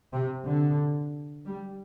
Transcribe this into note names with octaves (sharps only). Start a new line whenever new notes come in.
C3
D3
G3